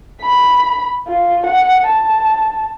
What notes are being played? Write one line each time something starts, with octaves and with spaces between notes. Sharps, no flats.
B5
F4
F#5
A5